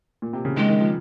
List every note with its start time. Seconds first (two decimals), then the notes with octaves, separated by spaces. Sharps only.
0.22 A#2
0.33 C3
0.45 C#3
0.57 D#3 G#3
0.69 D#3
0.80 F3